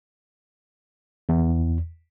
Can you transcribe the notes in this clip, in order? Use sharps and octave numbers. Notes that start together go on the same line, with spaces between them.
E2